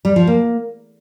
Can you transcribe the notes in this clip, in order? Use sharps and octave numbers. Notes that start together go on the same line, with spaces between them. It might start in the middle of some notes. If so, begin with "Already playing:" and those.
G3
F3
A#3